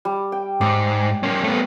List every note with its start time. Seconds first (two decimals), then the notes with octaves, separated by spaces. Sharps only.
0.05 G3
0.32 G5
0.61 G#2 D5
1.23 A#3 C#4
1.44 A3 B3